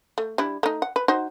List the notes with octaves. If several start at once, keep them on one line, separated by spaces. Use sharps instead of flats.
A3
G3 D4 E4
A3 D#4
F#5
B4
D#4 F#4 C5